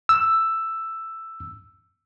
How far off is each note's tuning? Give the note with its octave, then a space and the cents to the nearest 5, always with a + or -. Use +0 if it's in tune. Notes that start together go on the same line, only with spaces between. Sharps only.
E6 +5